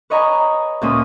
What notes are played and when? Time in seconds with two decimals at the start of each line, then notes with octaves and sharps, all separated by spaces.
0.10 B4 C#5 D#5 G#5 A#5 B5
0.81 D2 A#2 C#4 D#6